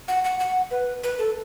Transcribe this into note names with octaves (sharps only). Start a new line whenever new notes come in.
F#5
F#5
F#5
B4
B4
A4